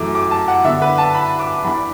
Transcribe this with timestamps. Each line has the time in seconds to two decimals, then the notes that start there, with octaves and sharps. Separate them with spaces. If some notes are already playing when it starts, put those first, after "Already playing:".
Already playing: F#2 E3 A3 D6
0.15 D6
0.31 A5
0.48 F#5
0.64 D3 B3 D4 E5
0.82 B4
0.98 A5
1.14 B5
1.39 D6
1.65 E2 E3 D4 B5